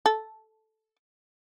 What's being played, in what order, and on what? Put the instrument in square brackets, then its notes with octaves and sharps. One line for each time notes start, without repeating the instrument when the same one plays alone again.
[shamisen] A4